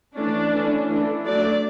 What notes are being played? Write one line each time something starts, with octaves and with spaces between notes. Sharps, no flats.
E3 A3 C#4 D4
E3 A3 C#4
E3 A3 D4
F#3 A3 D4 D5